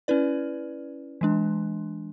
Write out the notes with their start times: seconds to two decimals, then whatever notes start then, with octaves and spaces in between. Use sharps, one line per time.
0.08 C#4 E4 B4 D5
1.21 E3 G#3 D4